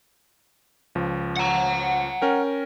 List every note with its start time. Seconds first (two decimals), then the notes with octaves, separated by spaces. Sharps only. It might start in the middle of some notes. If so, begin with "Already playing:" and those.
0.95 C#2 F3
1.36 F#5 A#5
2.22 C#4 A#4 G5